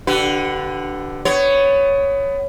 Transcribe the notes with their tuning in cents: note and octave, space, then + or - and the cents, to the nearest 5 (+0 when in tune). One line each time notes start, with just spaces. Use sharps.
D3 +0 G4 -40 B4 +10
B3 +25 C#5 +0